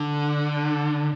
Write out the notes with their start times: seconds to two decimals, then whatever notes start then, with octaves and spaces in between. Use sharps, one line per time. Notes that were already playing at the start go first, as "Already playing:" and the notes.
Already playing: D3